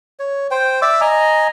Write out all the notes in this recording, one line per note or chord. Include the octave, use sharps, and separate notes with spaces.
C#5
C5 G5
D5 E5 D6 E6
D#5 G#5 A#5